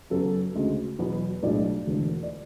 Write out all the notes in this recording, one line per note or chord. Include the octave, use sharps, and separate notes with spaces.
F#2 C#3 F#3 B3 A4
D2 C#3 G#3
E2 B2 F#3 B3 B4
B1 A2 G#3 D4 D5
E1 D2 D3
D5